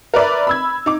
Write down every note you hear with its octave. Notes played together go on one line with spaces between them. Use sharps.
A#4 B4 D5 E5
B5 E6 G#6
D#4 D6